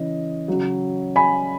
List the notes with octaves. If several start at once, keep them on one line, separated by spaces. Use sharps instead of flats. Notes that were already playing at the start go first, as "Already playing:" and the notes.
Already playing: C#3 E3 D#5
C#3 F#3
G#5 B5